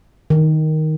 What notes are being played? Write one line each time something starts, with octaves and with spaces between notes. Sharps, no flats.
D#3